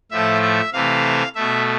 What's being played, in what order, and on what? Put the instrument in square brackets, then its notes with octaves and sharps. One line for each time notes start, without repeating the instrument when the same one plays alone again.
[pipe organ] A2 F3 A3 E5
E5
C3 E3 A3 F5
B2 A3 E5